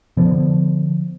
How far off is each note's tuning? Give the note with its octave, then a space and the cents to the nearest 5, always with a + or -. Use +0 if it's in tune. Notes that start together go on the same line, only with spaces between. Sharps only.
D3 +0 F3 +0 B3 +0